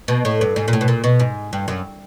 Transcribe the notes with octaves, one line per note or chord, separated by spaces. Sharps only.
B2
A2
G2
G#2
A#2
A2
B2
A#2
B2
G#2
G2
F#2